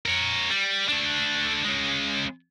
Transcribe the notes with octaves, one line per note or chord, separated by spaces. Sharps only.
A#4 C#5
G3
A3 D4
C#3 G#3